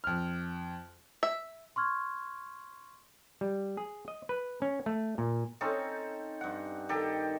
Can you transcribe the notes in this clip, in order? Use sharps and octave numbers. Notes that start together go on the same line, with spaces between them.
F2 F6
E5
C6 C#6 F6 G#6
G3
G#4
D#5
B4
C#4
A3
A#2
C4 C#4 D#4 A4
G2 F#5
D#3 G4 A4